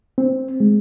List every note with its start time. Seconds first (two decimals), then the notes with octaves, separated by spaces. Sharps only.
0.18 C4
0.60 G#3